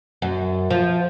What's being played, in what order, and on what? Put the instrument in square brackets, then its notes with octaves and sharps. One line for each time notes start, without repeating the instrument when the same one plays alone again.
[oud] F#2
F3